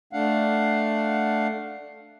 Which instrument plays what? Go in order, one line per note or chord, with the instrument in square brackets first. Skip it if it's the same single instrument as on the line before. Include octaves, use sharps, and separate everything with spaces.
[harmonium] A3 D4 F5 F#5